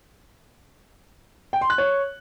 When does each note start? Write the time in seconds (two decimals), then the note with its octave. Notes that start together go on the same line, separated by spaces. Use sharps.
1.53 G5
1.61 C6
1.70 F#6
1.78 C#5